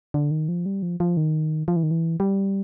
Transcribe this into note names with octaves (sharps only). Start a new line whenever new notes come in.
D3
D#3
F3
G3
F3
F3
D#3
F3
E3
D#3
E3
G3